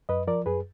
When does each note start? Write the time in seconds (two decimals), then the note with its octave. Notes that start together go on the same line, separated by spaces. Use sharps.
0.09 F#2 B4 D#5
0.28 F3 A#4 D5
0.46 F#2 G#4 B4